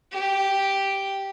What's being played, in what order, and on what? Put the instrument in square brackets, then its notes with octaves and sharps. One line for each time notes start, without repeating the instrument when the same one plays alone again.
[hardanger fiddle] G4